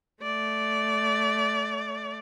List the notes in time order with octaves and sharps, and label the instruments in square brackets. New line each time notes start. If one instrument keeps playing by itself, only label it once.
[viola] A3 D5